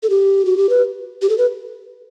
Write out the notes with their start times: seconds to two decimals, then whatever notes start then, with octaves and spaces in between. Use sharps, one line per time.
0.03 A4
0.10 G4
0.45 F#4
0.57 G4
0.69 B4
1.22 G4
1.29 A4
1.38 B4